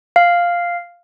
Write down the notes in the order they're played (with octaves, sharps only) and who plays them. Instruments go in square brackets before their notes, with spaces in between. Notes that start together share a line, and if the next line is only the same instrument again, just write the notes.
[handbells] F5